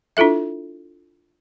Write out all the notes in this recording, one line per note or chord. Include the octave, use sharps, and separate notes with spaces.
D4 E4 F4 A4 E5